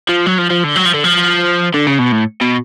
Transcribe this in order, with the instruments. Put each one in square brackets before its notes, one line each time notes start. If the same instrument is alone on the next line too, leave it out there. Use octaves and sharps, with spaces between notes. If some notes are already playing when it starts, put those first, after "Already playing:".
[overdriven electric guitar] F3
F#3
F3
F3
D3
F#3
F3
D3
F3
D3
C#3
B2
A2
B2